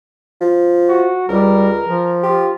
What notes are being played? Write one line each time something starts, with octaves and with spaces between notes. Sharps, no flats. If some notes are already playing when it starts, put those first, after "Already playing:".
F3
F#4
C#2 G3 A#4
F3
F4 G4